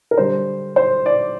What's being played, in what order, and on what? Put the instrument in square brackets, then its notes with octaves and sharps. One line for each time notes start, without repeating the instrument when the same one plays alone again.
[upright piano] A#4
D3 G3 D4 C5
C5
D5